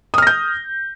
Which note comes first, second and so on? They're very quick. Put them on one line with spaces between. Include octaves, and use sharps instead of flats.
D#6 F6 A#6 G6